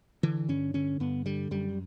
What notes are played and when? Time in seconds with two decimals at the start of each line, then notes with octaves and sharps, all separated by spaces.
0.23 D3 E3
0.49 G2 C#4
0.74 D3 C#4
1.00 G2 B3
1.26 D3 G3
1.51 F#2 G3